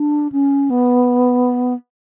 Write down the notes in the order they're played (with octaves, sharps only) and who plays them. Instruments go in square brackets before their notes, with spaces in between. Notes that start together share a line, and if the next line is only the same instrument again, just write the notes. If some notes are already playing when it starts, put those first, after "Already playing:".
Already playing: [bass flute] D4
C#4
B3